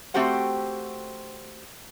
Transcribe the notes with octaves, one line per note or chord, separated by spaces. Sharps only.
A3 C4 F#4 G4 C5 F#5